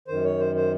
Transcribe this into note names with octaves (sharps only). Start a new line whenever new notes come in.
F#2 D#3 C5
C#5
C5
C5